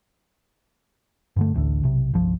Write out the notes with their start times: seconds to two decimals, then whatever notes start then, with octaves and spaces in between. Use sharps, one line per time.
1.36 G2 D3 A3
1.54 A1 D2 A2 D3
1.83 B1 C3
2.13 G1 C2 F3